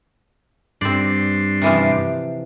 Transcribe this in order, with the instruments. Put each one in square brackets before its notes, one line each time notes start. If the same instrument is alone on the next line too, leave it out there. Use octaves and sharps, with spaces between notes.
[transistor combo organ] G2 D4 C6 [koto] C4 D5
[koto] C3 E3 F3